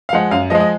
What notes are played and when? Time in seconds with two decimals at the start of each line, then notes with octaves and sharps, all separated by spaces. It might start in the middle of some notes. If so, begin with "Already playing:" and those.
0.09 F5
0.13 F3 G#3 F#5
0.31 F#2 F5
0.50 F3 G#3 D#5
0.60 D#5